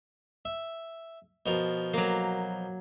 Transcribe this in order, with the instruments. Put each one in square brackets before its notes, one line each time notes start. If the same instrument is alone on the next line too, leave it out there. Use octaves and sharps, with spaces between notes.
[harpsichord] E5
B2 F3 A#4
[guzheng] F#3 A#3